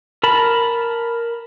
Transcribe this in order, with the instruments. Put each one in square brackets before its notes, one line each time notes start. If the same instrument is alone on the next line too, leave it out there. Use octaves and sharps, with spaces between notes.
[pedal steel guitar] A#4 A5 B5